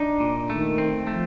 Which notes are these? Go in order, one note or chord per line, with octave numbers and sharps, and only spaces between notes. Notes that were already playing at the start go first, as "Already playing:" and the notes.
Already playing: D4 D#4
A#2
D#3 A3
C4
F3 A3